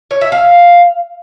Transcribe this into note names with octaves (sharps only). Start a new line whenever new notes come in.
C#5
E5
F5